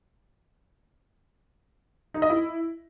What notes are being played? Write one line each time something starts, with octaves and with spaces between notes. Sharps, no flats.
D#4
D#5
E4